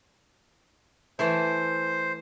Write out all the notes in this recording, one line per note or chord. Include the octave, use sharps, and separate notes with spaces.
E3 A3 E4 C5